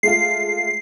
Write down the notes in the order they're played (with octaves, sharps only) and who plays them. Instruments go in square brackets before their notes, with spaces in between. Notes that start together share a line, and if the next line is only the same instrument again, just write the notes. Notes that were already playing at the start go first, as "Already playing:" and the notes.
[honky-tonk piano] G#3 A3 F4 [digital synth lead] C7